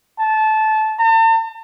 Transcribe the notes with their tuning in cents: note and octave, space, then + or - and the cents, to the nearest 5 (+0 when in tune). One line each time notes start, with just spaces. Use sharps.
A5 -20
A5 +45